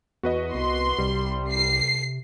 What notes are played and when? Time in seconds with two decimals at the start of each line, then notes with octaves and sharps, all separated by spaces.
0.23 E2 B3 F#4 B4 D#5
0.54 C2 C6
0.98 C2 C3 G3
1.52 C7